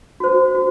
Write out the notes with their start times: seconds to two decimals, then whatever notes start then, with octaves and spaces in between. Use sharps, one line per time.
0.20 F#4 C5
0.55 F#4